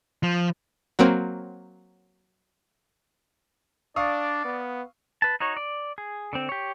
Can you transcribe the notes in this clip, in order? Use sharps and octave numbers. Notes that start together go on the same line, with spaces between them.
F3
F#3 A#3 C4
D4 D5 F5 C#6 D#6
B3
B4 A5
D#4 F#4 C#5
D5
G#4
D3 C4
G4 C#5